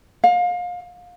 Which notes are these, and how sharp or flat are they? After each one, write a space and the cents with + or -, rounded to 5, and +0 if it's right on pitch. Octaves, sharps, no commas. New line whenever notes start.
F5 +30